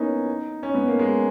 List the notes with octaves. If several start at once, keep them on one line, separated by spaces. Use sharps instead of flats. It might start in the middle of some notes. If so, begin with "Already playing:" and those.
Already playing: A#3 B3 C#4 D#4 E4
C#4
B3
A#3
G#3